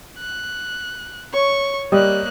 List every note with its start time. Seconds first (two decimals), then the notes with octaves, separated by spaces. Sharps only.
0.19 F#6
1.33 C#5 C#6
1.92 G3 A#3 D#5 F#6